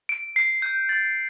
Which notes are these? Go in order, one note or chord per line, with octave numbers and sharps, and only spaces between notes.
D7
C7
G6
A6